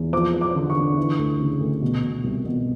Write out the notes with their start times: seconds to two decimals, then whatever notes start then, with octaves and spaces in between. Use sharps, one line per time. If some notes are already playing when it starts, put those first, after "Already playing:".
Already playing: E2
0.13 F3 D6
0.34 F3
0.41 D6
0.55 D3
0.70 C#6
0.76 D3
0.97 E3
1.18 D2
1.40 C#3
1.60 D2
1.82 B2
2.03 B2
2.24 C2
2.45 B2